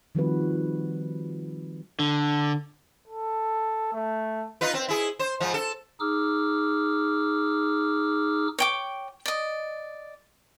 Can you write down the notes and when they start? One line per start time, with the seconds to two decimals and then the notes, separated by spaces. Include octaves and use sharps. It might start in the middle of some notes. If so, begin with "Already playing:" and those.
0.15 D#3 F3 G3 C4 F#4 B4
1.99 D3
3.08 A4
3.93 A3
4.61 D#4 F4 B4
4.74 C4
4.88 E4 G#4
5.19 C5
5.40 G#2 F3
5.54 A4
6.00 D#4 G#4 D6 E6 F6
8.59 C#5 G5 D6
9.26 D5 D#5